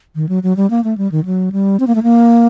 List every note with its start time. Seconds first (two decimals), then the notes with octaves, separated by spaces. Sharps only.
0.15 D#3
0.29 F#3
0.43 F#3
0.57 G3
0.70 A#3
0.84 A3
0.98 G3
1.12 D#3
1.25 F#3
1.52 G3
1.80 C4
1.87 A#3
1.95 A3
2.03 A#3